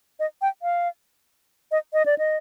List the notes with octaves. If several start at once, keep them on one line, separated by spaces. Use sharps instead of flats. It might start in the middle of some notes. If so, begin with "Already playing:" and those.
D#5
G5
F5
D#5
D#5
D5
D#5